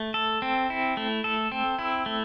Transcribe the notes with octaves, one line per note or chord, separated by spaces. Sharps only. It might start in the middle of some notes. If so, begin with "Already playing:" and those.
Already playing: A3
A4
C4
E4
A3
A4
C4
E4
A3